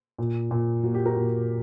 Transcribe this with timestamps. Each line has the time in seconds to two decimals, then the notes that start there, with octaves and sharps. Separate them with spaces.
0.18 A#2
0.51 A#2
0.84 A#3 F#4
0.94 G4
1.05 F#4 A#4
1.16 A#2